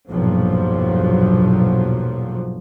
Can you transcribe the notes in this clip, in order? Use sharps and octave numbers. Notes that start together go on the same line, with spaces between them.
B1 E2 G2 A#2 F3 F#3